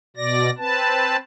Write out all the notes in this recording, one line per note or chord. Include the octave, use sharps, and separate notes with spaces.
B2 D5 A#6
C4 B4 A5